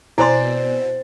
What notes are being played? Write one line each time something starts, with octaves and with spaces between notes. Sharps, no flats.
B2 C4 E4 C5 D5 G#5 C6 A6